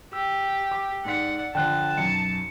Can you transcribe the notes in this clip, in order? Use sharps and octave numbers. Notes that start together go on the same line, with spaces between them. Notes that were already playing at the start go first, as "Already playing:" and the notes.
G4 E6
D6
G#2 D5 F#5 B6
D3 F3 G5 A5 F#6
B1 F#2 C#7